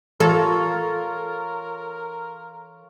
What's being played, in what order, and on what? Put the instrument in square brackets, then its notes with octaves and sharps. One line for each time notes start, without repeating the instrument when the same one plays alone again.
[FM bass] E3 [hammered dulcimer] F4 C#5 A#5 [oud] A4 [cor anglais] A#4